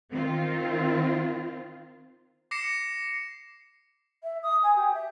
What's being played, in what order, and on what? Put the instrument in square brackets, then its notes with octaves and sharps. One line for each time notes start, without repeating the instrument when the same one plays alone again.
[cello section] D#3 C4 F4
[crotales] D6 A#6 C7 C#7 E7
[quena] E5
D#6
G#5
G4
E5